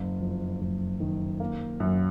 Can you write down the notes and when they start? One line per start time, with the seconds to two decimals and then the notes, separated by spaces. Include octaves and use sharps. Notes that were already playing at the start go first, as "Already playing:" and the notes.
Already playing: F#1
0.20 F2
0.60 F#1
1.00 D#3
1.40 A#3
1.80 F#2